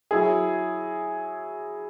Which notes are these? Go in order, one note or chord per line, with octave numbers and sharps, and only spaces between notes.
F#3 E4 G#4